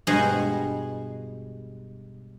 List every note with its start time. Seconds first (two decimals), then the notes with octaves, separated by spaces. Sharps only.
0.07 G2 B2 G#3 C5 F#5 G#5